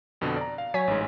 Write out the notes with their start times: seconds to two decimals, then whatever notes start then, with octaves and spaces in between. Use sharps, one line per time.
0.21 F2 B2 D3
0.37 D5 A#5
0.58 F5
0.74 F#3 C#5 G#5 B6
0.88 A1 G#2